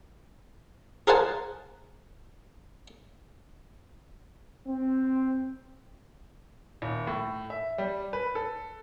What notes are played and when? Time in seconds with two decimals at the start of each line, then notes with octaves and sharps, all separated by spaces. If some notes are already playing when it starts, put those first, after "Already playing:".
1.07 G#4 A#4 C5 F#5 G#5 A5
4.67 C4
6.82 D#1
7.07 A2
7.50 E5
7.78 G3
8.13 B4
8.35 A4